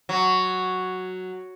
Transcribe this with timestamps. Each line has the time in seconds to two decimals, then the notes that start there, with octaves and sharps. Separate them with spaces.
0.09 F#3